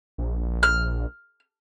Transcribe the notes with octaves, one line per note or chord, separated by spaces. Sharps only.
A#1
F6